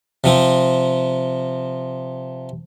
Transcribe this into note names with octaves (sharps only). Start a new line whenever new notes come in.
C3 F3 C4